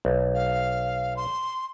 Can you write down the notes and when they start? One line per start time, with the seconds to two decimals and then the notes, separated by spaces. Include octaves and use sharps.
0.05 B1
0.35 F5
1.16 C6